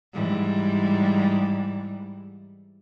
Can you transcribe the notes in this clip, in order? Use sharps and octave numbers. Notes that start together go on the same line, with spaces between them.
G#2 E3 G3